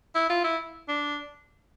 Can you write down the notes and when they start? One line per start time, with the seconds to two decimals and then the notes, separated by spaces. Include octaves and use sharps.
0.15 E4
0.30 F4
0.44 E4
0.89 D4